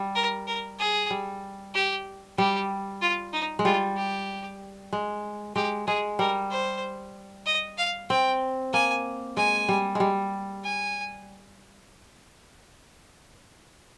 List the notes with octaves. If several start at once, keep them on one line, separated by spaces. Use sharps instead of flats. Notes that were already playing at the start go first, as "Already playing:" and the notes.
Already playing: G3
A#4
A#4
G#4
G3
G4
G3 G4
F4
D#4
G#3
G3 F4
G4
G#3
G#3 G4
G#3 G#4
G3 A#4
C5
D#5
F5
C4 G5
A#3 G#5
G#3 G#5
G3
G3 G#3
G#5